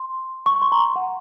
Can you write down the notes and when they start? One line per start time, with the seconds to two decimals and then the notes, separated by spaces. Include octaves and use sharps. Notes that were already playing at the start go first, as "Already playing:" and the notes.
Already playing: C6
0.46 C#6
0.62 C6
0.72 A#5
0.79 C6
0.96 F#5